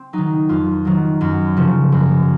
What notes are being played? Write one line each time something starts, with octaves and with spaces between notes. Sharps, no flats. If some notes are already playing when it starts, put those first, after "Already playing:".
Already playing: C4
D#3 F#3 D#4
F2 F4
D#3 F#3
F#2
C#3 F3
F#2